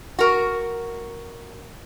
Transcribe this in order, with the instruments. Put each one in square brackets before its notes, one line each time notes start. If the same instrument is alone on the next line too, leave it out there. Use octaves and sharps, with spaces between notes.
[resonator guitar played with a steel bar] F#4 A#4